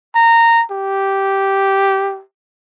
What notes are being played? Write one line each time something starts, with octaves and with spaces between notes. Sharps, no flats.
A#5
G4